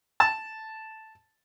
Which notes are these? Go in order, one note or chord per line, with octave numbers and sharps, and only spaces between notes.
A5